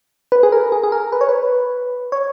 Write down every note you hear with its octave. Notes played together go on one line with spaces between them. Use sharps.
B4
G#4
A#4
G#4
G#4
A#4
B4
C#5
B4
C#5